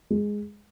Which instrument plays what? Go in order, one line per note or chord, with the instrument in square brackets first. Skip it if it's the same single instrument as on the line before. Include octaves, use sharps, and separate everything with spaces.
[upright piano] G#3